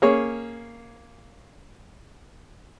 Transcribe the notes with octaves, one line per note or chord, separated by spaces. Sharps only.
A#3 C#4 G#4 C#5